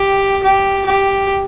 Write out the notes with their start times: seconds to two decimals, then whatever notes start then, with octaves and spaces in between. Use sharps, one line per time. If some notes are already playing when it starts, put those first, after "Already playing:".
Already playing: G4
0.43 G4
0.86 G4